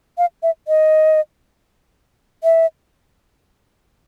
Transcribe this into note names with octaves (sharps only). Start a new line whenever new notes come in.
F5
E5
D#5
E5